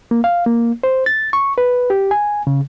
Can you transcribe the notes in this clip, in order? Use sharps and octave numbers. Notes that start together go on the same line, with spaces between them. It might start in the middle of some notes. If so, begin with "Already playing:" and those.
A#3
F5
A#3
C5
A6
C#6
B4
G4
G#5
C#3